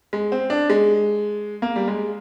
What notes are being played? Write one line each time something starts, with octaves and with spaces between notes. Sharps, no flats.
G#3
C4
D4
G#3
A#3
G3
G#3